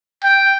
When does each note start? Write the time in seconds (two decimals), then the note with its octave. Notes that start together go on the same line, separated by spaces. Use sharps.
0.24 G5